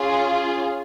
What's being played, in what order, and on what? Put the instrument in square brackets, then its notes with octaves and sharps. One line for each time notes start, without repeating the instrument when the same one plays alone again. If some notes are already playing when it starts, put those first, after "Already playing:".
Already playing: [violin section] C#4 F4 G#4